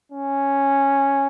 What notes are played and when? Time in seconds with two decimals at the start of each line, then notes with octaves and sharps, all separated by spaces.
0.12 C#4